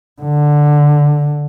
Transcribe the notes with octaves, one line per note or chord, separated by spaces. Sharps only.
D3